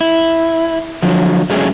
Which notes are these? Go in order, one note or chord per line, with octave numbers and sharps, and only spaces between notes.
E4
D3 F3 F#3
G#2 F#3 G#3 A3 C#4 G#4